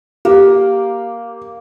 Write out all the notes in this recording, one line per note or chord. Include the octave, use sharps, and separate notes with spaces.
A#3 G4